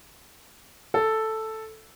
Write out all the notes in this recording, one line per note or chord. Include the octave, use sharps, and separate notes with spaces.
A4